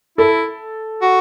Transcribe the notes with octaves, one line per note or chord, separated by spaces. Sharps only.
E4 A4
F#4